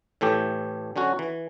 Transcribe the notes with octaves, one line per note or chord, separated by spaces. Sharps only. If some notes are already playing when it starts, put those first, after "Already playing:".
A2 E3 A3 G4
D3 F#3 C#4 F#4
E3